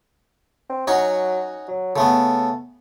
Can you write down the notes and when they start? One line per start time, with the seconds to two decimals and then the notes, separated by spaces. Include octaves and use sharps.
0.69 C4
0.87 F#3 C#4 D#4 F#4
1.68 F#3
1.96 C#3 A3 B3 A4